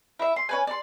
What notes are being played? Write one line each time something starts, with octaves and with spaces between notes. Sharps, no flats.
E4 E5
C6
C#4 B4 G#5
D5 C6